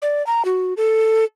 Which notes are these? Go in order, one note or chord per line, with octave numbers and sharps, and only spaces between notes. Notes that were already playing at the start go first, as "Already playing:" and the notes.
D5
A#5
F#4
A4